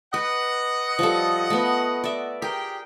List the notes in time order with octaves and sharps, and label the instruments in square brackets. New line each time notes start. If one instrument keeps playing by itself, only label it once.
[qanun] B4 [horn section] D#5 F#5
[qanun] F3 G3 A4
A3 B3
D5 E5
[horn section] G4 G#4 G5 [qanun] A#4